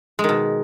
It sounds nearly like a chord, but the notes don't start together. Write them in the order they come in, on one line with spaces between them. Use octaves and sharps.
G#3 D#3 B2